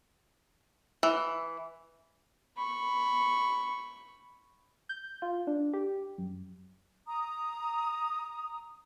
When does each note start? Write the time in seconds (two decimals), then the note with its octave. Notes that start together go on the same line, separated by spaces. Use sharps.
1.03 E3
2.57 B5 C#6
4.89 G6
5.22 F4
5.47 D4
5.73 G4
6.18 F#2
7.07 A#5 D#6